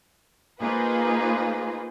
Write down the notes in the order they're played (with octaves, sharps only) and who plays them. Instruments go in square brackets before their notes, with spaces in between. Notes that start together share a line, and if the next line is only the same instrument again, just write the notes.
[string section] A#3 D#4 F4 G#4 B4 C5